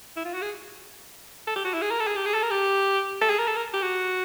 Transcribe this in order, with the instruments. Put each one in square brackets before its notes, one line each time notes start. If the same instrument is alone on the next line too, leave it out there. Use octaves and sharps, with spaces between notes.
[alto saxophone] E4
F4
F#4
G#4
A4
G4
F#4
E4
G#4
A#4
A4
G#4
G4
G#4
A4
A#4
G4
A4
G#4
A#4
A4
A#4
G4
F#4